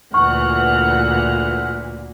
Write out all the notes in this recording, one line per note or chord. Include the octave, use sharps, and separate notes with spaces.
D2 A#2 E3 F#5 C#6 F6